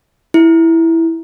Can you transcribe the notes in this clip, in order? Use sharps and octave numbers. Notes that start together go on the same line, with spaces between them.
E4